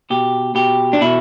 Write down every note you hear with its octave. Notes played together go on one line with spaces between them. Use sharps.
B2 G4
B2 G4
D4
B2 E4